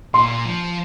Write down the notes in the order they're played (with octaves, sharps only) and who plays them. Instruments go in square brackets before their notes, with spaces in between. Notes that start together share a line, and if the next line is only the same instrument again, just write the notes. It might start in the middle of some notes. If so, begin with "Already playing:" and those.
[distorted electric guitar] A#2 [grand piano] C6
[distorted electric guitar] F3